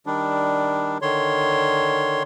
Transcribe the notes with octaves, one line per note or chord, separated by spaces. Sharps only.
D#3 G3 D4
D3 D#3 C#5 C6